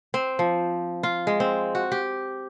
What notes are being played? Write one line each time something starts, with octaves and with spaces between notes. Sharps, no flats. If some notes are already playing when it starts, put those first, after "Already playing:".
C4
F3
F4
G#3
C4
F#4
G4